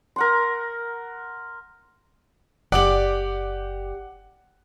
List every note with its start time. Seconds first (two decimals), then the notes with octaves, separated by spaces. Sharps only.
0.16 A#4 F#5 C6
2.72 F#1 G4 D5 F#5 D6 F#7